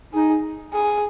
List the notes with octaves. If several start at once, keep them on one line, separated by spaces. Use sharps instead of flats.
D#4 G#4
G#4